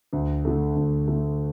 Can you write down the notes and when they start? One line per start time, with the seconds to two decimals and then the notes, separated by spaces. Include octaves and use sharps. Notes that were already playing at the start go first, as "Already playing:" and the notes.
0.13 D2
0.45 D3 A3
0.76 D2
1.08 D3 A3